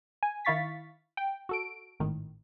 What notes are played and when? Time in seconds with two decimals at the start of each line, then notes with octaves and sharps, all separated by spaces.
0.23 G#5
0.45 D#3 E4 F5 C#6 A6 B6
1.17 G5
1.49 F#4 A4 D7
2.00 G#1 A2 D#3